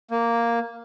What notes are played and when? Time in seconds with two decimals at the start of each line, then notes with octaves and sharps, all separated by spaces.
0.11 A#3